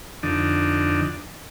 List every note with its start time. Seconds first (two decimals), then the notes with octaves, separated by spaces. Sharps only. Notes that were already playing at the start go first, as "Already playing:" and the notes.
0.23 F2 D3 D4 D#4